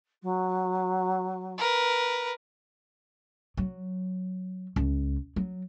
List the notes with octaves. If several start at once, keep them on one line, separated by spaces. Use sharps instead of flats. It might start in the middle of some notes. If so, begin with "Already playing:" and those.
F#3
A#4 B4
F#3
C#2
F#3